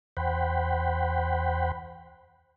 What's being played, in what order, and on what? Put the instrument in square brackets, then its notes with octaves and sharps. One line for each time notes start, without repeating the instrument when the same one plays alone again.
[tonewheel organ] E2 C5 F#5 G5 B5